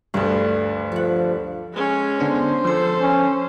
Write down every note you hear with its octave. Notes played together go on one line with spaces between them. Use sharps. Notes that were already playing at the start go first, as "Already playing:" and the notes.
D2 G2 D3 F3
F3 A4 F#5
G#3 C#4
D3 B3 D4 C5
F3 A4 C6
C#4